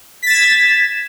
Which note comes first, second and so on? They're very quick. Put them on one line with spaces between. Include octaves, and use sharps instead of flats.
B6 A6 E7 G#6